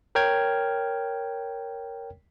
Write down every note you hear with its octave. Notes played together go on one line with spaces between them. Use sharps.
A#4 C#5 G5 F6 G#6